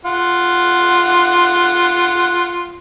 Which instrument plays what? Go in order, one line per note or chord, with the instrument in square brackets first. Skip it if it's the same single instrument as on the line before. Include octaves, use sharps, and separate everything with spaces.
[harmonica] F4 F#5